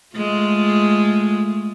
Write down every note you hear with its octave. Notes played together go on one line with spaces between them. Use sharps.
G#3 A3 F4